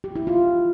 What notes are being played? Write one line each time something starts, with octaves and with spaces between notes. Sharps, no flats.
G4
E4
F4